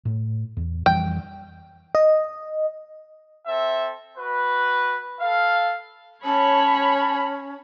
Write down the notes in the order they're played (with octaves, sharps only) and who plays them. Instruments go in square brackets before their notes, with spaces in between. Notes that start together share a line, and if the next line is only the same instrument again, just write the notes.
[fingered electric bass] A2
E2
[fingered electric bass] F2 E3 G3 [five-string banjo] G5
[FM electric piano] D#5
[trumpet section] C4 A4 E5
F#4 B4
A4 F5
[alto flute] C#4 [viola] C#5 B5 [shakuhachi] A5